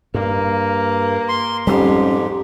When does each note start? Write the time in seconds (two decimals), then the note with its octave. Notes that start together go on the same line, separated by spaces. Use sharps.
0.14 G2 A#3
1.28 C6
1.67 F2 G#2 G3 A3 C#4 G4